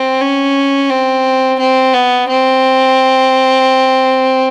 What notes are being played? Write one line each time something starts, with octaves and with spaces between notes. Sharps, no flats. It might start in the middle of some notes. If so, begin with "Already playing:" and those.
Already playing: C4
C#4
C4
C4
B3
C4